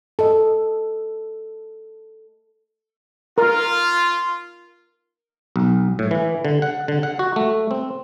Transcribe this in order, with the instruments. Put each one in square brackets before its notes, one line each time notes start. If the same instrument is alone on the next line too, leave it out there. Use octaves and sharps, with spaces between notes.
[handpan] A4 D#5
[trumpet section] F4 [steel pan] A#4
[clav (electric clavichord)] B1
A2
E3
D3
F#5
D3
F#5
F#4
A3
C4